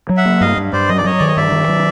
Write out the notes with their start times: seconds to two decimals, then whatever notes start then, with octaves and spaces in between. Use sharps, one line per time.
0.09 F#3
0.17 E5 F#5
0.25 A#3
0.41 G2 D#5 F5
0.57 G2
0.73 G2 C5 D5
0.89 F#3 D#5
0.97 D5
1.04 F#3 C#5 D#5
1.18 D#3 D5
1.28 D#5
1.37 G2 D5 E5
1.52 D#3
1.68 F#3